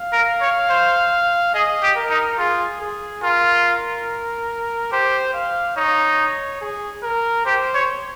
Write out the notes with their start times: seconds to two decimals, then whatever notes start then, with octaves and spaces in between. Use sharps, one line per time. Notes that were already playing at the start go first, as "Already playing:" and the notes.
Already playing: F5
0.13 A#4
0.41 C#5
0.70 C5
1.54 G#4 D#5
1.83 G4
1.96 A#4
2.10 D#4
2.38 F4 G#4
2.81 G#4
3.23 F4 A#4
4.92 G4 C5
5.34 F5
5.77 D#4 C#5
6.61 G#4
7.03 A#4
7.46 G4 C5
7.75 C#5